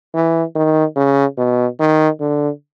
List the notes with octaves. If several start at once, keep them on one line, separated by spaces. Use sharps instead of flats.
E3
D#3
C#3
B2
D#3
D3